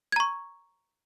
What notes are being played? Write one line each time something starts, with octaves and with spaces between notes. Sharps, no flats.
A#5 C#6 G#6